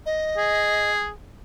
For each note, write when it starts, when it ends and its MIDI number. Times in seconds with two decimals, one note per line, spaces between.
0.06 0.91 75
0.37 1.10 68